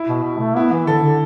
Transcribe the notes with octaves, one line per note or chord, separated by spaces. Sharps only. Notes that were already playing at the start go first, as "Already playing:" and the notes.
Already playing: E4
B2
B2
A3
B3 E4
E3
D3 A4
D3